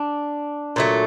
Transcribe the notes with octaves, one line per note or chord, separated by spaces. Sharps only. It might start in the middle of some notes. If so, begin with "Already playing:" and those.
Already playing: D4
A#2 F#3 A3